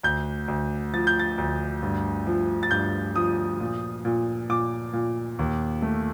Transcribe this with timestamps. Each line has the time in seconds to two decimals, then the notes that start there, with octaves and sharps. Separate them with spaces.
0.03 D2 G6
0.48 D2
0.94 F3 A6
1.07 G6
1.19 A6
1.38 D2
1.83 G2
2.27 F3
2.63 A6
2.71 G2 G6
3.16 F3 D#6
3.60 A#2
4.05 A#2
4.49 A#2 D6
4.93 A#2
5.39 D#2
5.82 A3